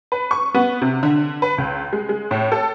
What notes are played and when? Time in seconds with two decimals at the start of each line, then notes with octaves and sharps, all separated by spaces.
0.12 B4
0.31 C#6
0.54 B3
0.81 C3
1.03 D3
1.42 B4
1.58 C#2
1.93 G#3
2.09 G#3
2.31 A2
2.52 A4